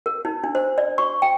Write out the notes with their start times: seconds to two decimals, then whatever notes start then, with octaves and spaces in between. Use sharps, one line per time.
0.06 A#4
0.25 D#4
0.44 D4
0.55 C5
0.78 D5
0.98 C#6
1.22 G5